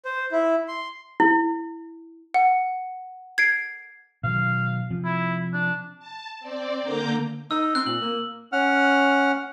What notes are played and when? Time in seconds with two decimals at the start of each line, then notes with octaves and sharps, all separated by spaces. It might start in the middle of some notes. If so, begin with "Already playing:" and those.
0.05 C5
0.32 E4
0.68 C6
1.20 E4
2.34 F#5
3.38 G#6 C7 D7
4.23 B2 D#3 F#3 F5
4.90 C3 F3
5.04 E4
5.53 D4
5.99 A5
6.40 C4 D5
6.83 D3 A#3 A#5 D6 G6
7.51 D#4 E6
7.75 C4 F#6
7.86 A#2 F#7
8.01 A#3
8.52 C#4 F#5 F6